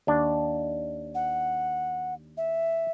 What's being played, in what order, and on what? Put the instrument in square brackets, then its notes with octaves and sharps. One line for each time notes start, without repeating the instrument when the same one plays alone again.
[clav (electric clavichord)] D#2 D4
[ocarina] F#5
E5